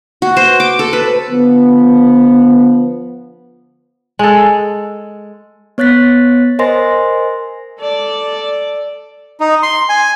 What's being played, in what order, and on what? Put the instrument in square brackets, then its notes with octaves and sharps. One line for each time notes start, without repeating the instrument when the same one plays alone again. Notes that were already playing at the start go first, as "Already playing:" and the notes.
[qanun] F#4
C5
D6
A4
B4
[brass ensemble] D3 F3 B3
[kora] G#3 A4
[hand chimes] B3 C#5 F#6 A6 B6
A#4 C5 D#5 G#5 C6 A#6
[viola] A4 D5
[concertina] D#4
C6
G#5